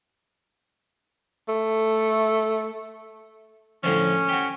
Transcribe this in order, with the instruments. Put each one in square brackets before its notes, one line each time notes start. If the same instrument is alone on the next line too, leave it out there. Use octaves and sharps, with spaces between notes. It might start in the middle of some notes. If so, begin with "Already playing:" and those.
[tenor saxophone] A3
[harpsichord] A2 D3 F3 [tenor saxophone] C#4
[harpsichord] F#4 G4